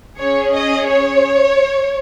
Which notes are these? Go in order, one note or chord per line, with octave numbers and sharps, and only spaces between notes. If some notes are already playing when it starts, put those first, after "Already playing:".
C#4 G#4 C#5
D#5
C#5